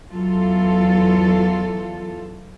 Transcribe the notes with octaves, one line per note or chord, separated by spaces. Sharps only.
E2 F#3 F4 A4